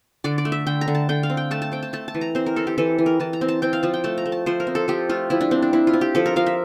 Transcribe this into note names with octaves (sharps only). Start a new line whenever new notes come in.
D3 D5
D5
A3
E5
D3 G5
A#5
D3
A5
D3 G5
F5
C4
G5
A3 A5
A5
C4 G5
A5
A3 A5
A5
E3
A#5
C4 C5
A#4
C4 A4
G4
E3 A4
E3
A#4
E3 A5
A#5
C4
A5
C4 G5
F5
F3 A5
G5
A3 A5
A#5
A3
A5
F3 C5
A#4
C4
A4
F3 G4
A3 F4
F3 E4
D4
C4
D4
C4 E4
F4
C4
G4
F3 A4
A#4
F3 F5
E5